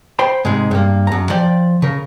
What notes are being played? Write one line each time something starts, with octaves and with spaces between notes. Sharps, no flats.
C5 G5 B5
G#2 C3 G#3
G2 A#3
F#2 A#5
F3 D5 G5
C#3 A#4